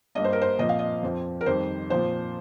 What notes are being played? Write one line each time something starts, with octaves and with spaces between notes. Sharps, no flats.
G2 G3 A#3 D#5
C5
A#4
C5
A#2 F3 C4 D#5
F5
D#5
F2 F3 C4
A#4
F2 D#3 G3 C5
A#2 F3 C4 C5